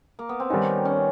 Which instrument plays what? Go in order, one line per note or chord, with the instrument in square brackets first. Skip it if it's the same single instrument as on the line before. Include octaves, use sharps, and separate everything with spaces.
[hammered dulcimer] A#3
B3
C4
[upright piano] D#3 G3 B3 D#4 [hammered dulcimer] C#4
[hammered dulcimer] C#4